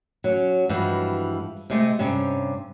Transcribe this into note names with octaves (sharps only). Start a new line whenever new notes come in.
F#3 C#4
G2 E3 F3 G#3 F#4
C3 G#3 A3
G2 C3 G3 C#4